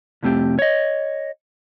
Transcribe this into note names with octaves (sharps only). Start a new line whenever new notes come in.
C2 F2 A3 C4 G4
C#5 D#5